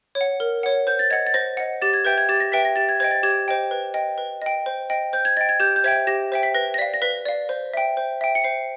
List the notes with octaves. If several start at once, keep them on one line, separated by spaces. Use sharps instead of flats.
C#5
F#5
A#4
C#5 F#5
C5 G6
A6
D#5 F#5 G#6
A6
C5 A#6
D#5 F#5
G4 A6
G#6
B4 E5 G5 G6
G#6
G4 A6
A#6
B4 E5 G5 B6
A#6
G4 A6
G#6
C5 D#5 G5 G#6
A6
G4 G#6
C5 D#5 G5
B4
D#5 G5
B4
D#5 G5
C5
D#5 G5
C5 G6
G#6
D#5 G5 A6
G#6
G4 G6
G6
C5 E5 G5 G#6
G4 A#6
C5 E5 G5
B6
B4 A#6
A#6
D5 F5 B6
A#6
B4 B6
D5 F5
C5
E5 G5
C5
E5 G5
C#7
C5 C7